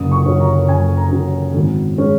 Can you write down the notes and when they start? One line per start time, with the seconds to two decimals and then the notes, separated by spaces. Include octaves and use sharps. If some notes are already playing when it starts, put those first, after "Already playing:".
Already playing: F#1 D#6
0.12 C#6
0.26 F#2 F#3 C#4
0.40 A#5
0.69 F#1 G#5
0.97 A#5
1.11 F#2 F#3 C#4
1.54 G#1
1.98 G#3 C#4